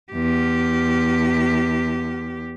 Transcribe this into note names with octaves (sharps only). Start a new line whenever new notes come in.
E2 G4